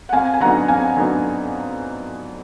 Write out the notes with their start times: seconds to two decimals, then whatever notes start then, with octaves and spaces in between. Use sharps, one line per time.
0.09 F#5
0.13 F2 F5 G#5
0.33 G#5
0.40 D3 F#3 B3 D#4 F#5 A#5
0.68 F2 F5 G#5
0.97 D3 F#3 B3 D#4